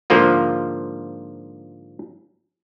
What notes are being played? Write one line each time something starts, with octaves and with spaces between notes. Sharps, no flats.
G#2 D3 F3 A#3 F4